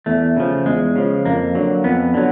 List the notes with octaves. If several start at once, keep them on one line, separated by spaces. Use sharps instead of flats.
E2 A3
C#3 F3
E2 G#3
C#3 F3
F2 A#3
D3 F#3
F2 B3
D3 F#3